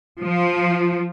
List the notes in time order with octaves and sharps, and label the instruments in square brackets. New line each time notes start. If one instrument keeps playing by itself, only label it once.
[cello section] F3